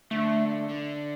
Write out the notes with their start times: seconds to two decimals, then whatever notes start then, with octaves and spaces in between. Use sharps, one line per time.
0.11 D3 A3
0.69 D3